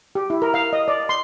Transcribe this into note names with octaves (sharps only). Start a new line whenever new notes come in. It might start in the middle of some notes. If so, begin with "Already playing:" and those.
G4
E4
A#4
F5
D#5
D5
C6